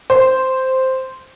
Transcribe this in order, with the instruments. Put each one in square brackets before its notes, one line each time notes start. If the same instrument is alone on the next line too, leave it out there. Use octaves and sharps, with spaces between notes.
[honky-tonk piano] C5